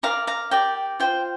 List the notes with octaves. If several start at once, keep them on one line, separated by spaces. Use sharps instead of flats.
G4 A#4 D5 F5 A#5
F5 A#5
G4 A#4 D5 G5
F4 C5 G5